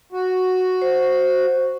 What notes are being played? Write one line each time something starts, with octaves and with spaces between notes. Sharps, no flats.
F#4
C5